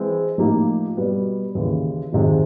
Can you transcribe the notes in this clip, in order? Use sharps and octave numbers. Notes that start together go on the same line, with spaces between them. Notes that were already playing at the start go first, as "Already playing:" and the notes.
Already playing: E3 G#3 C4
A2 F3 A#3 D#4 G4
B2 G3 B3
D#2 C#3 E3
F2 C3 D#3 G#3 C4